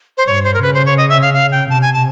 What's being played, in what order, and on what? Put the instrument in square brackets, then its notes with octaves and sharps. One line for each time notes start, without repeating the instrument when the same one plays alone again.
[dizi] C5
[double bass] G2 [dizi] C#5
[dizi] C5
A#4
[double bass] C#3 [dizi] B4
[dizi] C5
C#5
D#5
E5
F5
F5
G5
[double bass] C3 [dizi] A5
[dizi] G#5
A5